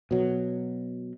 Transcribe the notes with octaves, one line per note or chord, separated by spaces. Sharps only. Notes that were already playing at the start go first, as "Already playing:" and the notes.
B2 F#3